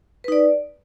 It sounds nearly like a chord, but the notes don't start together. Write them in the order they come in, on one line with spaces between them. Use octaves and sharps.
B4 D#4 D5